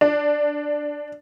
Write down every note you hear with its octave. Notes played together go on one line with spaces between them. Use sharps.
D4